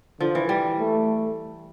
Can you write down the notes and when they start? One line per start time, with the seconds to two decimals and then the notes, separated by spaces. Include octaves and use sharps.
0.20 D3 F3
0.35 E3
0.49 G3
0.79 A3